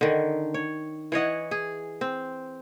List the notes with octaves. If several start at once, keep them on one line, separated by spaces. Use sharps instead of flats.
D3 D#3
C#5
E3 C#5 D#5 F#5
G#4
C4